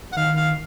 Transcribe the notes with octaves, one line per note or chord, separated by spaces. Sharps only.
F#5
D#3 F5
F5